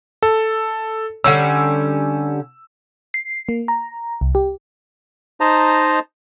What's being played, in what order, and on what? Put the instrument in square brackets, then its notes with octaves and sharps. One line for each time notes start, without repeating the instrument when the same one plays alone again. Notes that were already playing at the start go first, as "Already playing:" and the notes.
[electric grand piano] A4
[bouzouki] D3 G3 C#4 [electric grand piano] E6
[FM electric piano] C7
A#3
A#5
C2
G4
[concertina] D#4 C5 D#5 A5 A#5